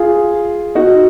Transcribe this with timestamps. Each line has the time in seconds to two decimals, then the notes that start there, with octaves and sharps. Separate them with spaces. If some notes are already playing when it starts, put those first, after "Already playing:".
Already playing: F4 G#4
0.75 D#4 F#4